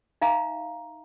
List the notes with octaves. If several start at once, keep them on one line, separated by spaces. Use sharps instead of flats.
D#4 E5 F5 A#5